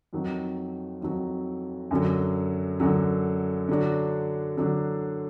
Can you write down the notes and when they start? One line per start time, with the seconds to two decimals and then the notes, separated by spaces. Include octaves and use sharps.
0.13 F2 D#3 F#3
1.01 F2 D#3 F#3
1.91 F#2 D3 F#3
2.80 F#2 D3 F#3
3.69 D3 F#3 D4
4.57 D3 F#3 D4